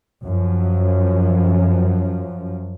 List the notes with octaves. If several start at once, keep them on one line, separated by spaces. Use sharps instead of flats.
F#2 F3